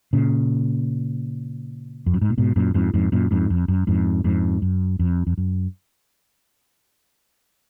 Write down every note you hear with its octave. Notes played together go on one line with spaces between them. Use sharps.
A#2 C#3
F2
F#2
G#2
A#2
G#2 B2
F#2 A#2
F2 G#2
F2 G#2
F#2 A#2
F2 G#2
F2
F#2
F2 G#2
F2 G#2
F#2
F2
F2
F#2